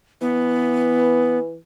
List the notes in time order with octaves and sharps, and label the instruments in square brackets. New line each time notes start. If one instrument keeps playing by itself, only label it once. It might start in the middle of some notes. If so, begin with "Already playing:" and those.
[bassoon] E3 [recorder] B3